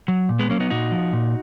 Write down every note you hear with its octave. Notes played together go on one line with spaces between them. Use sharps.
F#3
A#2
G#3 B3
F#3 A#3 C#4
B3 D#4
A#2 D#4 F#4
F3
A#2